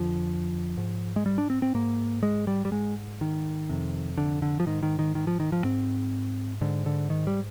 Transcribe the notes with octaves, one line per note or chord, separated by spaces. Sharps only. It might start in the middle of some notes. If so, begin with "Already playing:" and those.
Already playing: F2 D3 F3
G#2
G#3
G3
D4
C4
C4
G#2 A#3
G#3
G3
G3
G#2 G#3
D#3
F2 C3
D3
D3
F3
G#2 D#3
D#3
D#3
D#3
F3
D#3
F3
G#2 C4
G#2 D3
D3
D#3
G3